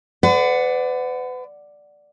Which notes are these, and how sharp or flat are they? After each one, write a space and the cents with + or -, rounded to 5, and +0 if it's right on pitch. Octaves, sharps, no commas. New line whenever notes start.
B4 +40 D5 +0 F#5 +0